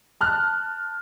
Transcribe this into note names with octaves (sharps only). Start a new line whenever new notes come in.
A5 F6 F#6